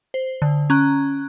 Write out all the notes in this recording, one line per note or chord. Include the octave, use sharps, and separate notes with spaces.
C5
D3
C#4 A#5 F#6